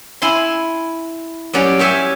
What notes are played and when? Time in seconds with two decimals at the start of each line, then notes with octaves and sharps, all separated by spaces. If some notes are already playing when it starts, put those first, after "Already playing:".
0.22 E4 G#5 C6
1.53 F#3 G3 C#4 D5
1.79 G4 C#5 E5 G#5